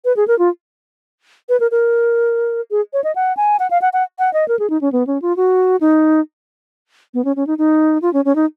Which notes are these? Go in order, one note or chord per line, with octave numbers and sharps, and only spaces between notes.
B4
G#4
A#4
F4
B4
A#4
A#4
G#4
C#5
D#5
F#5
G#5
F#5
F5
F#5
F#5
F#5
D#5
A#4
G#4
D#4
C#4
B3
C#4
F4
F#4
D#4
B3
C#4
C#4
D#4
D#4
F4
C#4
C#4
D#4